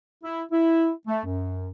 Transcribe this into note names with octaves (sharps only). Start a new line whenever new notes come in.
E4
E4
A3
F#2